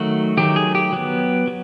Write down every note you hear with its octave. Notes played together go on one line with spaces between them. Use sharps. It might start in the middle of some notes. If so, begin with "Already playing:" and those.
Already playing: D#3 F#3 A3 F#4
D#3 F#3 A3 G4
G#4
G4
F#3 B3
F#3